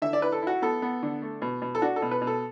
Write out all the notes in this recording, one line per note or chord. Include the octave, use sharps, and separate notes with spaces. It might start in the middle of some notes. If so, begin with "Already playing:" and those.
D3 E5
D5
E4 B4
A4
E4 F#4
B3 A4
B3
D3
A3
B2
B2
A4
D4 F#4
A4
B2
B4
B2
A4